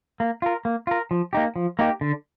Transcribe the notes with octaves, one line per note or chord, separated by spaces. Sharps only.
A#3
F4 A#4
A#3
F4 A#4
F3
A#3 D#4 G4
F3
A#3 D#4 G4
D3